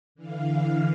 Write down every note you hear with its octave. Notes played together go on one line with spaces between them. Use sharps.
D3 E3 F5